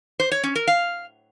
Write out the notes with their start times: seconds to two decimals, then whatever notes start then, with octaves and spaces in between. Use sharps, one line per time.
0.20 C5
0.32 C#5
0.44 C#4
0.56 A#4
0.67 F5